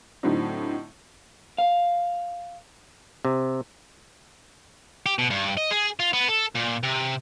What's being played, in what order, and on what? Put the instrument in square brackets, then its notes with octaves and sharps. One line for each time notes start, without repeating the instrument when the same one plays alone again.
[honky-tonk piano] A2 D3 F#3 C4 D4 D#4
[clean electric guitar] F5
[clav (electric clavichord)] C3
[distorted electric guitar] G4
B2
G2
D#5
G#4
F4
B3
A4
A#2
C3